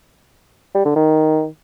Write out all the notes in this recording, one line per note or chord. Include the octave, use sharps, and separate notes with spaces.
G3
D3
D#3